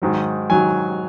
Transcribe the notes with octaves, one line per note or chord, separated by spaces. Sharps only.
G#2 D#3 F#3
D#3 F#3 G#5